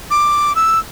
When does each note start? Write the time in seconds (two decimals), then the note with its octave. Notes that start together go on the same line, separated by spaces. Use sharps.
0.11 D6
0.55 E6